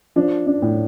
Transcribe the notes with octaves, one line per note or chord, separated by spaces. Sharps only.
F3 D4
D4
A2